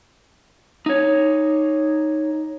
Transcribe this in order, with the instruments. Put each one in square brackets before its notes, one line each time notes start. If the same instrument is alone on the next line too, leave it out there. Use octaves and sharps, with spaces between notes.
[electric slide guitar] D#4 C#5